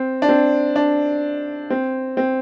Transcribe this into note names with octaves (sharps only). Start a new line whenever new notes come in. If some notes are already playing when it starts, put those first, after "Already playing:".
Already playing: C4
D4
C4
D4
C4
C4